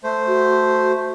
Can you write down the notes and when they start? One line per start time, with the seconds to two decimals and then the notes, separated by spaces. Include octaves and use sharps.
0.04 A3 C5
0.27 F#4